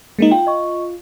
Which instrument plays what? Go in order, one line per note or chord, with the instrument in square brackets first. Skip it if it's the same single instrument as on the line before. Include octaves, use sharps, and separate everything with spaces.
[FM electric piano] G#3 A#3 D#4
[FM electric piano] F4 [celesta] G5
[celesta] D#5 C#6